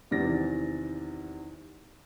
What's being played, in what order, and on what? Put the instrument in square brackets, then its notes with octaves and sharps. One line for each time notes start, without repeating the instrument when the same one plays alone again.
[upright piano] E2 C3 D#3 D5 A6 A#6